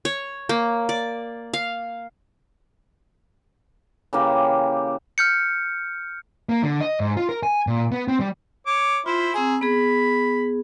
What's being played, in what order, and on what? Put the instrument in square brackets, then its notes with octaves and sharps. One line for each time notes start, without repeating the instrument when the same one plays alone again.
[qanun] C#5
A#3
D5
F5
[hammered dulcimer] C#3 E3 A#3 G4
[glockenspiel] F6 G6 C#7
[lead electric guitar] A#3
D3
D#5
G#2
F4
A#4
G#5
A#2
B3
C4
G3
[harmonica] C#5 D6
[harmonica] E4 C5 [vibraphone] F4
[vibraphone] C4 A#5 E6 [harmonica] G#4
[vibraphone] B3 G#4 [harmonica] B5